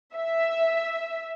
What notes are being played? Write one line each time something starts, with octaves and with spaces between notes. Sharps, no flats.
E5